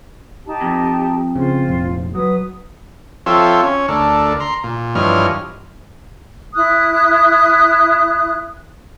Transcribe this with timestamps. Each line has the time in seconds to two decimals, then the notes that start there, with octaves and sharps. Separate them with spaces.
0.45 D#4 G4 A5
0.61 F2
1.36 C#3 F4 C5
1.68 F1 A#1
2.15 F#3 B4 D#6
3.26 F3 C4 F4 A4 C#5 E5
3.63 C#4 C#5
3.88 D2 D4 A4 A#4
4.40 A#5 C6
4.64 A#2
4.95 G2 E3 F3 C#5 D#5 F6
6.54 E4 D#6 F#6